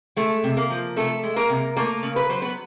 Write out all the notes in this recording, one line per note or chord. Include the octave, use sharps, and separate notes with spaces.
G#3 A3 A4
C3
A#3 A#4
F3
C3 A3 A4
G#3
A#3 A#4
C3
A3 A#3 A#4
C#3
B4
F#3 C5
B3 B4